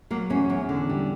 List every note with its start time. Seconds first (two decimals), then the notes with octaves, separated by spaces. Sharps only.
0.10 F#3 A#3
0.30 E2 C#4
0.50 E2
0.69 D3
0.89 G3